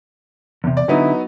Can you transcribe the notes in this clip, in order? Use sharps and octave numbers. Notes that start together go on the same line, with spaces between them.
E2 C3
D5
D3 F#3 B3 D#4 E4